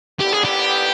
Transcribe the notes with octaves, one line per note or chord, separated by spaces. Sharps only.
D#2 D3 G3 B3 E4 G4
G#4
G4